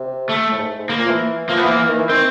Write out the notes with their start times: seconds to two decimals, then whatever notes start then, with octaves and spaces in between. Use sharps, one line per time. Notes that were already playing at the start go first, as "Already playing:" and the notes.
Already playing: C3
0.29 A3
0.52 A2
0.59 G#2
0.78 G#2
0.89 A#3
0.98 A#2
1.05 F3
1.09 E3
1.49 F3 A#3
1.57 B3
1.64 E3 A#3
1.79 E3
1.89 D#3
1.99 E3
2.09 D#3 C4